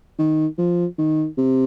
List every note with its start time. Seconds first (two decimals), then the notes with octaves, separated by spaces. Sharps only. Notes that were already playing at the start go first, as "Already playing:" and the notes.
0.19 D#3
0.58 F3
0.99 D#3
1.38 C3